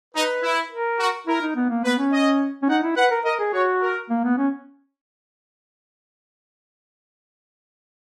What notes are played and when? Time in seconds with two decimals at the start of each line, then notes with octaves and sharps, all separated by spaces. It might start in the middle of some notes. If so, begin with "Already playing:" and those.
0.14 D#4 B4
0.43 E4
0.71 A#4
0.99 F#4
1.27 E4 A#4
1.42 D#4
1.56 B3
1.70 A#3
1.84 B3 B4
1.98 C#4
2.12 D#5
2.62 C#4
2.69 D#4 F#5
2.83 E4
2.96 B4 F#5
3.10 A#4
3.25 A#4 D#5
3.39 G#4
3.53 F#4 C#5
3.81 A#4
4.10 A#3
4.24 B3
4.38 C#4